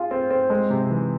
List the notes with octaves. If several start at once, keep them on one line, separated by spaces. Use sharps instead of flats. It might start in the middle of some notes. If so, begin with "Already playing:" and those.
Already playing: F4 G#4
C4
C4
G#3
C3
E3